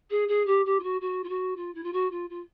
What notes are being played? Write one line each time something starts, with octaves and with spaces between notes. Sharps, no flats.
G#4
G#4
G4
G4
F4
F#4
F#4
F4
F#4
F4
E4
F4
F#4
F4
F4